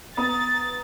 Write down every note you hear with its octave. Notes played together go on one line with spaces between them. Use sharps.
B3 A#5 D#6 A6